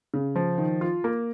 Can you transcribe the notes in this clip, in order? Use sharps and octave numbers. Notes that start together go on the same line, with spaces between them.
C#3
F3
D#3
F4
A#3